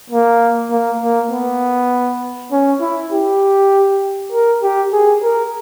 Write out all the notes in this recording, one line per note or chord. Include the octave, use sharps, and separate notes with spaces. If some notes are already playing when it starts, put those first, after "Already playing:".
A#3
A#3
A#3
B3
C#4
E4
G4
A#4
G4
G#4
A#4